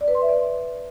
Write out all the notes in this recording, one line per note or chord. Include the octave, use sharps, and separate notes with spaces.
D5
B4
C6
E5
D5